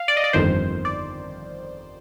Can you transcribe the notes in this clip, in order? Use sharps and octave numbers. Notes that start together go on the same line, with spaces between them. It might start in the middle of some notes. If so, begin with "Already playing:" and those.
Already playing: F5
D5
D#5
D5
G1 F2 D#3 C5
D5